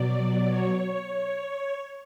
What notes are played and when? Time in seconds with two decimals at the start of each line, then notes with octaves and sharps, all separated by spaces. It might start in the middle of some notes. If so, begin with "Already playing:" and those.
Already playing: B2 F#3 D5
0.44 C#5